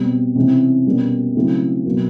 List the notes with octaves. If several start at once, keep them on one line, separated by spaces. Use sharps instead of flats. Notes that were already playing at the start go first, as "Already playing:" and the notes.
Already playing: B2 G3 C4
C3 E3 G#3 C#4
B2 G3 A#3 C#4
C#3 F#3 A3 C4 E4
B2 F#3 A#3